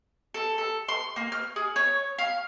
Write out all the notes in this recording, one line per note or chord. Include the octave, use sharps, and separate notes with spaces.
A4
A4
C6
A#3
F6
G#4
C#5
F5